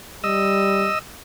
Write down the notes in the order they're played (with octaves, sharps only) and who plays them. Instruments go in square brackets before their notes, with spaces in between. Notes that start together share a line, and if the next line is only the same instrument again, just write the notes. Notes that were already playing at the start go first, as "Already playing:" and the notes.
[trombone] G3 [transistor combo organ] D#5 E6